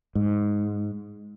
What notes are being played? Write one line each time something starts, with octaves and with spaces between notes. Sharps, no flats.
G#2